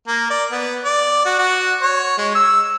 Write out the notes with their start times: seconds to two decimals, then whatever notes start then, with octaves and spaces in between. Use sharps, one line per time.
0.07 A#3
0.30 D5
0.52 B3
0.84 D5
1.25 F#4
1.39 F#4
1.82 C#5
2.18 G#3
2.35 E6